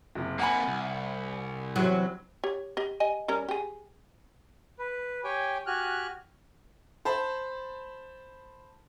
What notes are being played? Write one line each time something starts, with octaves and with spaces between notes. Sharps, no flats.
F#1 C3
C3 A#3 F#5 G#5 B5
C2
E2 C3 F#3
G4 C#5
G4 D#5
G4 D#5 G#5
G3 C#4 A#4
G4 G#4
B4
G4 C#5 G5 G#5
F#4 G4 G#5 F6 F#6
C5 A5 B5